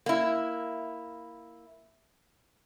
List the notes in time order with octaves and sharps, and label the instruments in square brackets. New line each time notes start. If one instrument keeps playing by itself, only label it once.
[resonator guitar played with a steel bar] A#3 E4